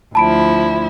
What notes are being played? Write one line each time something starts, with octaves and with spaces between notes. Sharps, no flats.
D2 F3 E4 A5 B5 D7